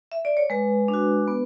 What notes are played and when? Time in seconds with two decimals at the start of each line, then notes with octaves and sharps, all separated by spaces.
0.12 E5
0.25 D5
0.37 C#5
0.50 G#3 B4
0.88 D4
0.94 F#4
1.28 B3